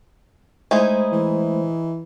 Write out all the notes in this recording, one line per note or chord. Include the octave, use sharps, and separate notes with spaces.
G#3 A3 D#4 E4 G#4 C5
E3